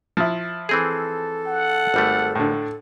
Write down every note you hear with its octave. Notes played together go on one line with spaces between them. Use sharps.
F3 E4
E3 C4 G#4 A4
F#5
G#1 G3 A3
A2 D3